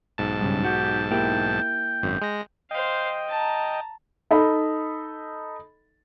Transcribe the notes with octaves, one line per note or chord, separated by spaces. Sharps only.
B1 G#2 A5
G2 C#3
F#4 G4
A#3 E4 G4 G5
G#1 F#2
G#3 A#6
C5 D#5 F5 G5
A5 A#5
D#4 A4 D#5 B5